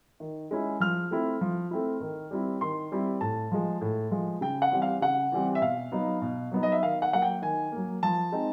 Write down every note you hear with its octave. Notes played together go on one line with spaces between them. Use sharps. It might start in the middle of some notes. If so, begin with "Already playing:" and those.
D#3
G#3 C#4 E4
F3 F6
A3 C4 E4
F3
A3 C4 E4
D#3
G3 C4 E4
D#3 C6
G3 C4 E4
A2 A5
F3 G#3
A2
F3 G#3
C#3 G5
F#5
E3 G3 C4
F5
C#3 F#5
E3 G3 C4
E5
B2 F5
F#3 B3 D#4
B2
F#3 B3 D#4
D#5
E5
D#3 F5
F#5
F#3 A#3 F#5
G5
D#3 G#5
F#3 A#3
F3 A5
G#3 C4 D#4